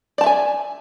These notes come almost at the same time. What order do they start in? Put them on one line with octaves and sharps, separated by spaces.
D5 A5 E5 G#5